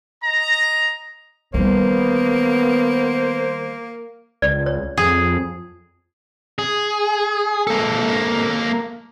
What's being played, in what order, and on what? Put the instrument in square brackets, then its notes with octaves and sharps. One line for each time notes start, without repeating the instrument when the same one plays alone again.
[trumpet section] D#5 A#5
[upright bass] D#3 G3 [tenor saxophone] A#3 [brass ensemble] B3 [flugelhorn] C5
[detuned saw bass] C#2 [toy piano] D5
[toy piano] C#5
[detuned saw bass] F2 [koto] G#4
[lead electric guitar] G#4
A#3 A4